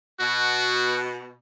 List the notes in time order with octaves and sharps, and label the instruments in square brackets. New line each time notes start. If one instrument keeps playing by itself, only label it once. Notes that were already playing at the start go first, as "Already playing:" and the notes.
[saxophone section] B2 [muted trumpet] F#4